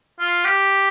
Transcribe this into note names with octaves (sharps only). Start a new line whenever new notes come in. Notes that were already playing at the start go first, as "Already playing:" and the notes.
F4
G4